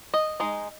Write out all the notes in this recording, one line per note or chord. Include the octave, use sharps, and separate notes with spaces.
D#5
G#3 D#4